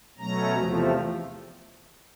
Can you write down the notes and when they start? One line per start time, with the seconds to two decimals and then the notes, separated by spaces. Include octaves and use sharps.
0.18 B2 F#3 A3 C#4 A#5
0.54 E2 C3 F3 A3